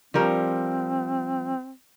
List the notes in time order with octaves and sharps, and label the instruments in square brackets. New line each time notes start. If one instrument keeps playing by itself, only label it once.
[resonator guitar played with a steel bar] F3 G3 A#4 [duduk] C4